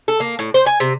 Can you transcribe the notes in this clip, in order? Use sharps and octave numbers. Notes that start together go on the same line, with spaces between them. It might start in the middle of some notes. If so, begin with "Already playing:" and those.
A4
A#3
A2
C5
G#5
C3